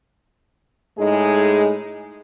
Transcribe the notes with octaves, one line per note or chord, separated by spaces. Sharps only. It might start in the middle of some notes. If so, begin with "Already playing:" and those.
A2 G#3 D#4 G#4